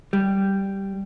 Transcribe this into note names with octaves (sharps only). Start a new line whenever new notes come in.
G3